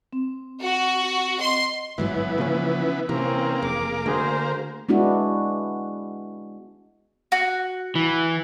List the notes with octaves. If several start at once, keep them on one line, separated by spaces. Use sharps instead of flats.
C4
F#4
D#5 C6
G1 G#2 E3 F#3 B3
C#3 F3 A#3 C#4
C3 E3 A#3 C4 C#4
F1 G#4 D6
D3 A3 F#4 G#4 C5
G#3 B3 D4 E4 F#4
F#4
E3